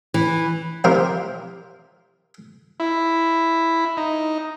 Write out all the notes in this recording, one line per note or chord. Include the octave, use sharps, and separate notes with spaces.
E3
C3 F3 E4 F4 G4 A#4
E4
D#4